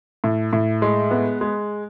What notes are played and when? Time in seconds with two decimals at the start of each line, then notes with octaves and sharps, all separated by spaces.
0.24 A2
0.53 A2
0.82 G#3
1.11 B3
1.41 G#3